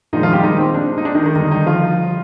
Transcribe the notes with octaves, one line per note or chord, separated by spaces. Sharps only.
A#2 D#3 F3 G#3 D#4
F3 F4
G3 G4
D#3 D#4
C4
D4
D#4
D4
D#3 D#4
D#3 D#4
D3 D#3 G3 D#4
D#3 D#4
F3 F4